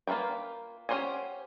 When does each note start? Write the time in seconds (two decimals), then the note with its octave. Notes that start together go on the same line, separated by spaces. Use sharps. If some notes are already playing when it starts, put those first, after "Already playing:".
0.07 A#3 F4 A#4 B4 G5
0.89 C#4 G4 C5 F#5 G#5